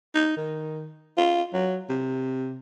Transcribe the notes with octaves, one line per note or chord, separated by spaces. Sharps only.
D#4
D#3
F4
F#3
C3